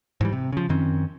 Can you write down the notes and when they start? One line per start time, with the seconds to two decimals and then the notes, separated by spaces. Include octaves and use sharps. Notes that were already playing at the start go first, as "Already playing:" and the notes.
0.21 G#2 E3 G3
0.32 C3
0.52 C#3 F3
0.69 F#2 D#3 C4 C#4